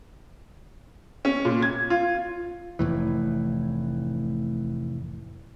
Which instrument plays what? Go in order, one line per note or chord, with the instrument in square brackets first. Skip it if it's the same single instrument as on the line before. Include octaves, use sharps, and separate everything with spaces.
[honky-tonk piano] C#4
A#2
G#6
F4
[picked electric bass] F1 A2 E3